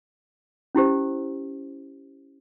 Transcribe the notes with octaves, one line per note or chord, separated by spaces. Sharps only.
C#4 E4 G4 C5